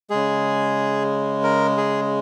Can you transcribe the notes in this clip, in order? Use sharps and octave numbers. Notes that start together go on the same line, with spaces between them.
C#3 G#3 G#4
A#4
G#4